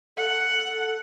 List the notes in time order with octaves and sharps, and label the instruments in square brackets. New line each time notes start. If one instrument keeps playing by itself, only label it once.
[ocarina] A4 [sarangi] F#5